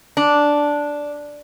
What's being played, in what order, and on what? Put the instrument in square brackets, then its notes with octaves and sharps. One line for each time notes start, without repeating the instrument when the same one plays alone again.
[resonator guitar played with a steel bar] D4